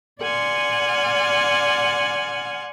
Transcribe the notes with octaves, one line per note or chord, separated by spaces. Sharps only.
D5 F#5 G#5 C6 F6